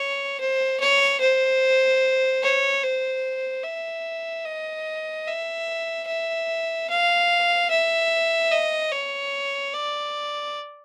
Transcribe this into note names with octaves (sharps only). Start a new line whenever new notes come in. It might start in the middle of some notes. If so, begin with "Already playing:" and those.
Already playing: C#5
C5
C#5
C5
C#5
C5
E5
D#5
E5
E5
F5
E5
D#5
C#5
D5